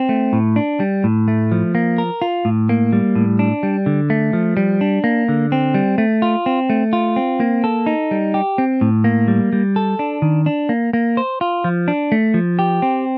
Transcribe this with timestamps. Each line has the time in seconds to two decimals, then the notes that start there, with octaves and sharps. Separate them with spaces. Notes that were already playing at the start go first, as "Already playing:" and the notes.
Already playing: C4
0.09 A3
0.33 A2
0.56 D4
0.80 G3
1.04 A2
1.28 A3
1.52 F3
1.75 A#3
1.98 A#4
2.22 F4
2.45 A2
2.69 A#3
2.93 G3
3.15 A2
3.39 D4
3.63 G3
3.86 D3
4.10 A3
4.33 F3
4.57 G3
4.81 D4
5.04 A#3
5.29 D3
5.52 C4
5.74 G3
5.98 A3
6.22 F4
6.46 C4
6.70 A3
6.93 F4
7.16 C4
7.40 A#3
7.64 A4
7.86 D#4
8.11 G3
8.34 G4
8.58 C4
8.81 A2
9.04 A#3
9.28 G3
9.53 G3
9.76 A4
9.99 D4
10.22 D#3
10.46 D4
10.69 A#3
10.93 A#3
11.17 C5
11.41 F4
11.64 F3
11.88 D4
12.12 A3
12.34 F3
12.59 G4
12.82 C4